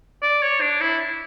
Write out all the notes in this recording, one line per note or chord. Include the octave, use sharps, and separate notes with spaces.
D5
C#5
D4
E4